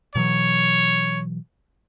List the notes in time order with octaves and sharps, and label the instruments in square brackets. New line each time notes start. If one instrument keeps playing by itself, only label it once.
[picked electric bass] B2 E3 F#3 [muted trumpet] C#5